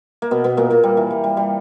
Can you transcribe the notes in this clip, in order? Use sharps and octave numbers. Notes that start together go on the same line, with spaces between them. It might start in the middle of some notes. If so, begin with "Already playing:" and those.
A#3
B2 B3
B2 B3
A#2 A#3
A#2 A#3
G3
E3
G3
G3
G3